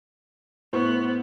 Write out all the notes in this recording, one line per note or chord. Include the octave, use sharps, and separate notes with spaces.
A2 B3 C5 C#6